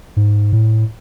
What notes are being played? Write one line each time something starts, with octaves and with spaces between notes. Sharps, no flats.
G#2
A2